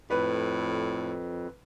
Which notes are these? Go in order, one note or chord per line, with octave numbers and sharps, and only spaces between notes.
F2 A2 B4